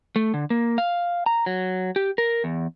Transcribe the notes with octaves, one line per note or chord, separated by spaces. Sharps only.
A3
D3
A#3
F5
A#5
F#3
G4
A#4
E2